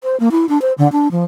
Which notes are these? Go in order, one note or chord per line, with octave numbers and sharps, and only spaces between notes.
C5
A#3
E4
D4
C5
D3
D4
F3